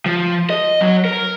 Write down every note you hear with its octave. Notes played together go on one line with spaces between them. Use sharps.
F3
D#5
F#3
A#4